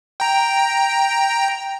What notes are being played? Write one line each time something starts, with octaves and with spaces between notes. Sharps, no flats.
G5 A#5